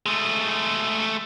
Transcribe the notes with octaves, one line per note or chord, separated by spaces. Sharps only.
G#3 A3